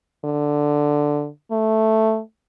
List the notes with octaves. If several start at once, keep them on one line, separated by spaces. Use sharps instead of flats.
D3
A3